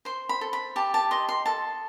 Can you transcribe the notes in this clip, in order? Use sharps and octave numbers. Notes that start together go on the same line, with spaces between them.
C5 C6
B5
A4
B5
G4 A5
A5
D#5 C6
C6
A4 A5